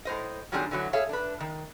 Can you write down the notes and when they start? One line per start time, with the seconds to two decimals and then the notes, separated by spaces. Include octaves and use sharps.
0.05 A2 C5 D#5
0.52 D#3 F#3 G3 C4 D4 G#4
0.71 D3 E3 F#3 F#4
0.93 G#4 A4 C#5 E5 F5
1.09 D4 B4
1.40 D#3